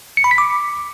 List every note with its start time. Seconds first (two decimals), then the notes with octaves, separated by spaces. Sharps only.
0.17 C#7
0.24 B5
0.31 B6
0.38 D6